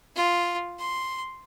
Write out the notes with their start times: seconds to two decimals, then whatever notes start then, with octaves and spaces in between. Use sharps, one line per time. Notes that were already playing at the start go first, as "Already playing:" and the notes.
0.16 F4
0.79 C6